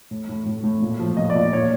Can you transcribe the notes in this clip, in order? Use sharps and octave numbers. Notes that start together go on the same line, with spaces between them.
A2
A2
A2
A2
A#2
F3
A#2 D#5
D5
A#2
A#2 C#5